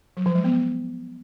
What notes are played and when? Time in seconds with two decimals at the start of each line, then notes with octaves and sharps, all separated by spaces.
0.17 F#3
0.26 F3
0.35 G#3
0.44 B3